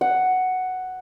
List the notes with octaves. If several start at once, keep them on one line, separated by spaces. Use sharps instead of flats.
F#5